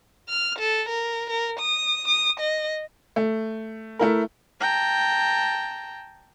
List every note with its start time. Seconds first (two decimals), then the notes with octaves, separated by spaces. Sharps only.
0.30 F6
0.59 A4
0.89 A#4
1.30 A#4
1.60 D#6
2.08 D#6
2.40 D#5
3.16 A3
3.99 A3 E4 A#4
4.60 G5 A5 A#5